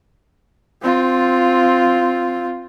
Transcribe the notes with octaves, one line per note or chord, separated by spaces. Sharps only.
C4 F4